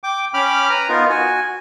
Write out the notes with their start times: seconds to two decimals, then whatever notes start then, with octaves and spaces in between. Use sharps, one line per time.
0.04 G5 D6
0.34 C#4 G5 B5 D6 F6
0.69 B4 A#5
0.89 B3 D#4 F4 A#4
1.09 F#4 G#5